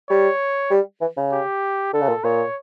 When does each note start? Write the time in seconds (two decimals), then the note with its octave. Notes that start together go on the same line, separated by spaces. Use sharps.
0.09 G3 C#5
0.71 G3
1.01 E3
1.17 C#3
1.32 G4
1.93 D3 A4
2.01 C#3
2.08 A#2
2.24 A#2 C#5